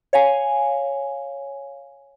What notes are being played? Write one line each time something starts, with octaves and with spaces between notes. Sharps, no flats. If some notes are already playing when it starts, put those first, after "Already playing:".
C#5 F5 G#5